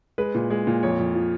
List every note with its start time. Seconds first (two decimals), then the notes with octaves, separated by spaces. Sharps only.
0.18 G#3 B4
0.35 A#2
0.50 G#3
0.67 A#2
0.83 F2 C#5
0.99 F2
1.15 F3